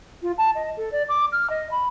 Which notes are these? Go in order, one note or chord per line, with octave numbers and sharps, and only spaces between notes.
F4
A5
D#5
A4
D5
D6
F6
D#5
B5